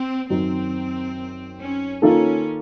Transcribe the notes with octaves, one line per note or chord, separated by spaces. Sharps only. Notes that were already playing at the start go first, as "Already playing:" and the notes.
Already playing: C4
F#2 D#3 F#3 C4
C#4
D#3 A#3 C#4 F4 A4